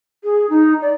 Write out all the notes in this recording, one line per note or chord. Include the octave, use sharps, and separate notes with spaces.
G#4
D#4
D5